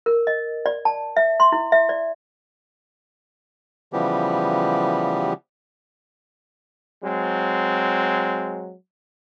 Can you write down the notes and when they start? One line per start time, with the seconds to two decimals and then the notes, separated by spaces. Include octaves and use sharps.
0.06 A#4
0.27 D#5
0.66 D5
0.85 A5
1.17 E5
1.40 C6
1.52 E4
1.72 E5
1.89 D5
3.93 C#3 E3 F3 G3 B3 G4
7.03 F#3 G#3 C4